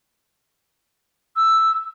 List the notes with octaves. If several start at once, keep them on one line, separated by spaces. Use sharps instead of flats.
E6